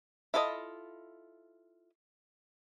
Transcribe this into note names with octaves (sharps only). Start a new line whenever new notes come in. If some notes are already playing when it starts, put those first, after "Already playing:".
E4 F4 A4 C#5 D#5